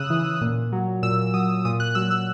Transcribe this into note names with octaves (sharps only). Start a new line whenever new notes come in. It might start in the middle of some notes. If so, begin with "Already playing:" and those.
Already playing: C#3 D#6 E6 F#6
E3
A#2
F#3
A#2 E6
F#3 D#6
A#2 D#6
F#6
F#3 E6
E6